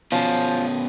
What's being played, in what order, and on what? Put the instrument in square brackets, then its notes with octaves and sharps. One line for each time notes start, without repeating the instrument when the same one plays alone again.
[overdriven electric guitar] B2 C#4 [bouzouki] F3